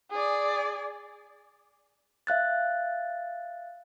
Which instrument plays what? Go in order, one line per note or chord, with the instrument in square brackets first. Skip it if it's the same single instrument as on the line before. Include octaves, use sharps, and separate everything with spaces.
[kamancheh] G#4 D5
[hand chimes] E5 F5 F#6 A6